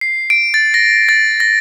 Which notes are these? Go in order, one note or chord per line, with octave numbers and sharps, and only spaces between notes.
C7
D7
A6
A#6
A6
A#6